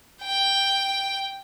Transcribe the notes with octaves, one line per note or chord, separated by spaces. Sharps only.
G5